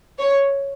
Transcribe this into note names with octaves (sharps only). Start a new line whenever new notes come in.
C#5